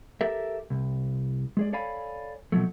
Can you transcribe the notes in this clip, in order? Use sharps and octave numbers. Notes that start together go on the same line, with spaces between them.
G4 A4 A#4 E5
C2
G#3 G#4 D5
A4 C#5 D5 F5 G#5 B5
B2 F3 F#3 A3